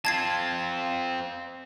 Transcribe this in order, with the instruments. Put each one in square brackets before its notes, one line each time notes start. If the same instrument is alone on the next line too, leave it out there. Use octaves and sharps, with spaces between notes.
[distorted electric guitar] C4 F4 [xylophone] A5 G#6 C7